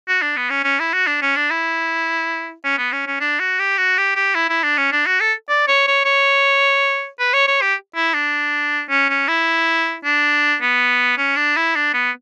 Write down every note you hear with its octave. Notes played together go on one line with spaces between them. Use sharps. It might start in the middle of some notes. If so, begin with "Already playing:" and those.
F#4
D4
B3
C#4
C#4
E4
F#4
D4
C#4
D4
E4
C#4
B3
C#4
C#4
D4
F#4
G4
F#4
G4
G4
E4
E4
D4
C#4
D4
F#4
A4
D5
C#5
C#5
C#5
B4
C#5
C#5
G4
E4
D4
C#4
C#4
E4
D4
B3
C#4
D4
E4
D4
B3